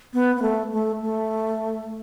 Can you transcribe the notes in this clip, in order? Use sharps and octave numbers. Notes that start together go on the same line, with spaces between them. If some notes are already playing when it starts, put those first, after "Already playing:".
B3
B3
A3
A3
A3